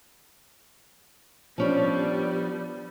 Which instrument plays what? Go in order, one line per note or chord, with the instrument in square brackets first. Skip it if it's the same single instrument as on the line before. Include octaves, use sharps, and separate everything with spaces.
[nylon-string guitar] F3 C#4 D4 [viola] G3 B3